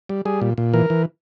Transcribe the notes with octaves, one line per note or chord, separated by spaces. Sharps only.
G3
G3 G#4
A#2
A#2
E3 A#4
E3